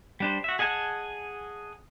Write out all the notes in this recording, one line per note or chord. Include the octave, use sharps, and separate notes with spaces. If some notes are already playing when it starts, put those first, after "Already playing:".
G3 D4 C5
F#4 E5
G#4 D#5 F#5 G#5 A5